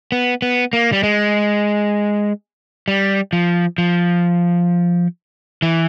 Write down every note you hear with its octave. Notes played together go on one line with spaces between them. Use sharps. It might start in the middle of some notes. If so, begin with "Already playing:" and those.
B3
B3
A#3
G3
G#3
G3
F3
F3
E3